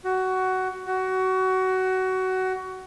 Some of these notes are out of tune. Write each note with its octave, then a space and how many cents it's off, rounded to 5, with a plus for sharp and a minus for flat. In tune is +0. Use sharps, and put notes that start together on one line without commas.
F#4 +15
F#4 +20